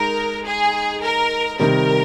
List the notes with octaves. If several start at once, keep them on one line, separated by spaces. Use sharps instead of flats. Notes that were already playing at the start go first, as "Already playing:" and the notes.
Already playing: G#3 D#4 A#4
G#4
A#4
C3 D#3 G3 A#4